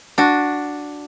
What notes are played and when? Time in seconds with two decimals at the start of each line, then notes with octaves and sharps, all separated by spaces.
0.18 D4 F#4